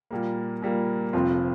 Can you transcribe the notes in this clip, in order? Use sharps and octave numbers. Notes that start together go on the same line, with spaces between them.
A#2 G3 A#3
A#2 G3 A#3
F1 F2 F3 C4 F4